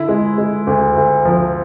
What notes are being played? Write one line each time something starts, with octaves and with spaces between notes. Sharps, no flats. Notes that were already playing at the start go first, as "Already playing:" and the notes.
Already playing: D3 E4
G#3
G#3
D2
D2
F3